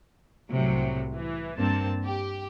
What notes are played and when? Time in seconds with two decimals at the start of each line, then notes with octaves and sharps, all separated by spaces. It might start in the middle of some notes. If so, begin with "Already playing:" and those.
0.51 C2 A2 C3 F#3
1.15 E3
1.57 G2 A#3 C4 A5
2.06 G4